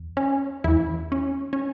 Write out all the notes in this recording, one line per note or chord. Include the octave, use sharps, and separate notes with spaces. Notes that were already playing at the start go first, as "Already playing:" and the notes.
Already playing: E2
C#4
E2 E3 E4
C#4
C#4